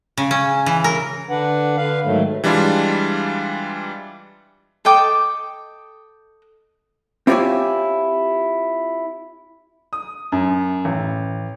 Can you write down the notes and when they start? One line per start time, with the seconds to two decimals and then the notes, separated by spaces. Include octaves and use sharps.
0.17 C#3
0.31 C#4
0.66 E3
0.84 A#4
1.30 D3 D4 B4 F#5
1.77 D3 B4 F5
2.04 G#2 D#3 F#3 A3
2.44 E3 G3 G#3 D4 F4
4.85 A4 D#5 G5 D6
7.27 C4 E4 F4 G4 C#5 G#5
9.93 D#6
10.32 F#2
10.85 A1